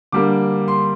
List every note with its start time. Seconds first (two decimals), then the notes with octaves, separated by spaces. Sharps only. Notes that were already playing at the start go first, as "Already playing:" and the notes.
0.12 D3 G3 A#3 D6
0.68 C6